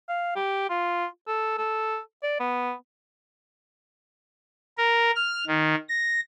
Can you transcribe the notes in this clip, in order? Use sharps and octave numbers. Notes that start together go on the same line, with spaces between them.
F5
G4
F4
A4
A4
D5
B3
A#4
F6
D#3
A#6